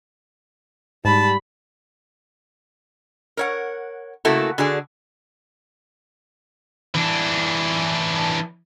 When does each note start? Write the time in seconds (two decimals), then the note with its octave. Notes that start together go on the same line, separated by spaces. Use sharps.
1.05 G#2 G3 A5 B5
3.37 A#4 C#5 F#5
4.25 C#3 A3 A#3 E4 F#4 A4
4.58 D3 F#4 G#4 D5
6.95 E3 D4